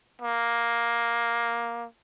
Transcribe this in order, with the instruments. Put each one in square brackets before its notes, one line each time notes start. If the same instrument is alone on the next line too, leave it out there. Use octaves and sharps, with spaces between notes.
[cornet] A#3